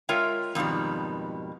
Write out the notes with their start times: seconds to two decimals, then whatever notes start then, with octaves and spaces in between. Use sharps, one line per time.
0.09 G#3 F4 A#4 C#5 E5 G5
0.55 F2 G#2 B2 D#3 G3